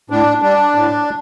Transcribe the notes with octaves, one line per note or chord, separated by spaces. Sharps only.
A2 D4
G3 D4
A2